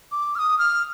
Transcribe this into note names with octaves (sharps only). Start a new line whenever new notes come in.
D6
F6
D#6
F6